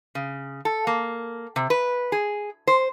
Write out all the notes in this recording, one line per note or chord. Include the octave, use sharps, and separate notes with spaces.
C#3
A4
A#3
C3
B4
G#4
C5